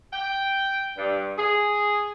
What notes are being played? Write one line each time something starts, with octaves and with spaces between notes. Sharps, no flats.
G5
G2
G#4